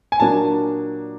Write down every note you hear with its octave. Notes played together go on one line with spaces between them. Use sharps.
G#5
A#2 F#3 A#3 D4 A5